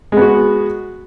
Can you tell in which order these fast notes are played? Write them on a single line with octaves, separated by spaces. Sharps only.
G#3 B3 F#4